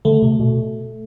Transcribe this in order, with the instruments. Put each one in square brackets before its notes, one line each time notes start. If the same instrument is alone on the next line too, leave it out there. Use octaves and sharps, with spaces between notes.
[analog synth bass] D3 [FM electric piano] A3
[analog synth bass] C3
B2